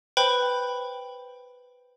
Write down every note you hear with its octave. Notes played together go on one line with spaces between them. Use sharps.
B4 C5 G5 B5